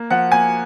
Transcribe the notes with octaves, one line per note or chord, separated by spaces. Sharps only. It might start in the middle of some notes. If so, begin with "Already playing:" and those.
Already playing: A#3
F3 F#5
A#3 G#5